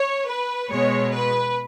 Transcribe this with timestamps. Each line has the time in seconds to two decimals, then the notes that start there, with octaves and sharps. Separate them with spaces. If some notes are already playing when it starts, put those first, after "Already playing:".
Already playing: C#5
0.29 B4
0.70 B2 G#3 C#5
1.12 B4